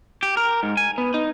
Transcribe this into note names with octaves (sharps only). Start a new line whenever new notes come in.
G4
A#4
G#2
G#5
B3
D#4